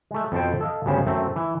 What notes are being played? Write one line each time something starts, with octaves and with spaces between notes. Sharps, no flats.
G#3 A3
F2 B2 A4 C5 G5
A4 D#5 F5
D2 G2 C#3 B3 C#4 C5
F#2 A3 C4
E3